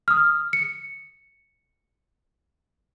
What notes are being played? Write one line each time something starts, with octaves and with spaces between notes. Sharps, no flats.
D#6 F6
C#7